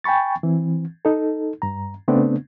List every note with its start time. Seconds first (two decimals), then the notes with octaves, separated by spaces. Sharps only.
0.04 G5 G#5 B5 C#6 A6
0.43 E3 C4
1.05 D#4 A4
1.62 G2 A#5
2.08 C#3 A3 B3 C4 D4